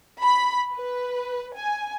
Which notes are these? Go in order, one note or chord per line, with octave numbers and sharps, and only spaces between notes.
B5
B4
G#5